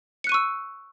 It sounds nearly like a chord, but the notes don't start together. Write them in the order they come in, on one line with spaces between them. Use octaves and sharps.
C#7 F#6 D#7 C#6 E6